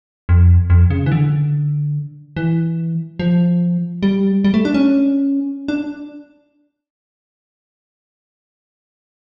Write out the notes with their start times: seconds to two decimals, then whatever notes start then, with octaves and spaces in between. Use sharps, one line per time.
0.29 F2
0.70 F2
0.90 C#3
1.06 E3
1.12 D3
2.37 E3
3.19 F3
4.03 G3
4.44 G3
4.54 A3
4.65 D4
4.74 C#4
5.68 D4